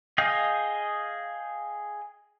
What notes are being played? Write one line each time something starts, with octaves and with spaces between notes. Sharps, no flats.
G#4 D#5 F5 G5